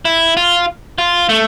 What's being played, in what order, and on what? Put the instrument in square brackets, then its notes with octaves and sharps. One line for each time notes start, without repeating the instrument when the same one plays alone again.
[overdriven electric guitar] E4
F4
F4
A3